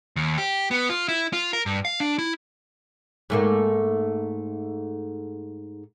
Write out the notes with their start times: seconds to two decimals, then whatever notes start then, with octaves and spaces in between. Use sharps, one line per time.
0.16 D#2
0.38 G4
0.71 B3
0.90 F4
1.08 E4
1.33 F4
1.53 A#4
1.66 G2
1.85 F5
2.00 D4
2.19 E4
3.30 G#2 A3 A#3